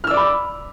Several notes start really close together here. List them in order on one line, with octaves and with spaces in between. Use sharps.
F6 E6 D5 D6 B5